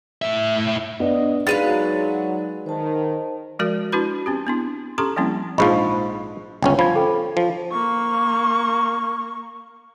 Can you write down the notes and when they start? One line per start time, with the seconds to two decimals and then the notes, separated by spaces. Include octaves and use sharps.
0.22 A2 E5
1.00 B3 D4 D#5
1.47 F#3 G#3 D#4 B4 D5 F5 A6 D#7
2.66 D#3 C5 A5
3.59 F3 G#3 F#4 A#4 D5
3.92 D4 E4 F#4 B4 B5
4.26 C4 C#4 G4
4.47 B3 D4 E4
4.98 C#4 G4 A4 A#5 C6 C#6
5.16 F3 G3 A#3 C4 C#4 E4
5.58 A#1 G#2 F3 D#5 B5 C#6
6.63 G1 C#2 C#4 G5
6.79 F3 B5 G#6
6.96 A4 G5
7.37 F3
7.72 A#3 C#6